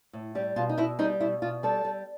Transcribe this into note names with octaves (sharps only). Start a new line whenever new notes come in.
A2
G3 G4
B2 F4
D#4
B2 E4
G3 D#4
B2 E4
B2 F4
G3 A4
G3